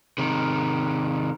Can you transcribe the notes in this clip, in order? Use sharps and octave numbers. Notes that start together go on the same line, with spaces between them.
C3 D#3